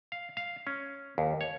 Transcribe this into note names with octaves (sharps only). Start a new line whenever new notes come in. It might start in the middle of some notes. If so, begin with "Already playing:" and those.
F5
F5
C#4
D#2
C#5